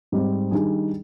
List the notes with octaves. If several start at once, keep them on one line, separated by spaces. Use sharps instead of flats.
G#2 G3 C4 D#4
D#3 G3 D4 G#4